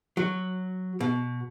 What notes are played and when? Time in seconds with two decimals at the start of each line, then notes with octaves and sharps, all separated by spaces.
0.17 F#3
1.00 B2